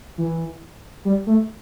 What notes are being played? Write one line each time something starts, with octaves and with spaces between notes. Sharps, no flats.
E3
G3
A3